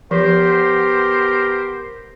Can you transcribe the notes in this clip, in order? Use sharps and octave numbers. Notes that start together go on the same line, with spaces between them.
F3 B3 G4 A#4 C5